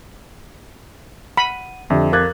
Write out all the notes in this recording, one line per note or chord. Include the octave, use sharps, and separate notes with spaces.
F#5 B5 D#7
F2 D3 G4 E5
A#4 F5 D6 F#6 G#6 A6